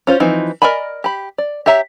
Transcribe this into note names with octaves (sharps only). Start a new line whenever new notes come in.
C#4 F4 C5
E3 F3 C4 D#4
A#4 D5 D#5 G#5 B5
G4 B5
D5
G4 C#5 E5 A#5